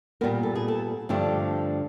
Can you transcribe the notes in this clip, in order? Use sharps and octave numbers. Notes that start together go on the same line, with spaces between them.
A#2 G3 B3 A#4
A4
G#4
A4
G2 D3 F3 A3 G4